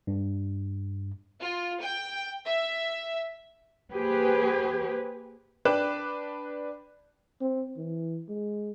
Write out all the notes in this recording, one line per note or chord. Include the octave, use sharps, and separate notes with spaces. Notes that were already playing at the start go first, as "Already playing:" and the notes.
G2
F4
G5
E5
A#3 G4 G#4 B4 C5
D4 B4 G5 D6 F#6 E7
C4
E3
G#3